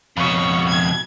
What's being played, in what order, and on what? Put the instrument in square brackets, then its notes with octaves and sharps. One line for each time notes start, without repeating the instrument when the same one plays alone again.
[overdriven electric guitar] F2 B2 [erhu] C#5
[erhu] G#6